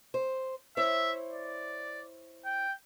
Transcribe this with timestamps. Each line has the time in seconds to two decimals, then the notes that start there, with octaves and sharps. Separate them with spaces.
0.14 C5
0.77 E4 C5 C#5 E5
1.32 D5
2.45 G5